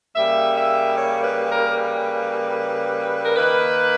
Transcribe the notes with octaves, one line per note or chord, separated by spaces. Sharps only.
C#3 G3 A#3 E5
E5
C#5
B4
A#4
B4
A#4
D#3 A#3 B4